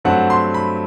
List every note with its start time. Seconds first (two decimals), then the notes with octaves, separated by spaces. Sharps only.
0.05 G2 F#3 A3 C4 F#5
0.30 C6
0.54 B5